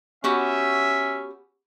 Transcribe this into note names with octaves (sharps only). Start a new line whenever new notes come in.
B3 C#4 F#4 G4 E5